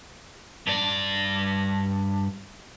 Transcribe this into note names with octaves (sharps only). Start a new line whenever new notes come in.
G2 D5